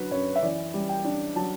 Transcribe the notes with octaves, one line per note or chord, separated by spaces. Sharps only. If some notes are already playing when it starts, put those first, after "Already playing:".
Already playing: D3 F#3 B4
F#2 C#5
E5
E3 D5
G3
G5
D4
F#3 A5